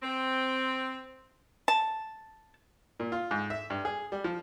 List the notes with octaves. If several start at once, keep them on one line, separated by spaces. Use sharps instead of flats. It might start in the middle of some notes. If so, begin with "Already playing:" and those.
C4
A5
A#2
F4
G#2
E5
G2
G#4
G3
F3